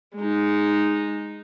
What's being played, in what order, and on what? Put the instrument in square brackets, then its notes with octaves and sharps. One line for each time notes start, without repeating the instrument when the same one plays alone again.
[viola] G#3 D#4